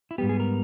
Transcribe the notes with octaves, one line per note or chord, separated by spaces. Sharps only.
E4
G#2 G3 B3 G4
G#4
A#4